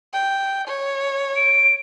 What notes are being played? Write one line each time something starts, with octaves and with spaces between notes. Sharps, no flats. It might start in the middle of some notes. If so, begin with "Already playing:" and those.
G5
C#5
D7